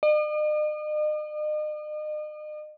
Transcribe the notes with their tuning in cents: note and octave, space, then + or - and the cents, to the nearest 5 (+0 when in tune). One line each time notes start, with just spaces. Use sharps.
D#5 -45